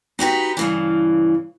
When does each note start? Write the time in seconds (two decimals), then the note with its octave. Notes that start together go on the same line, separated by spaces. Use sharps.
0.19 D#4 F#4 G4 B4
0.57 G2 C#3 E3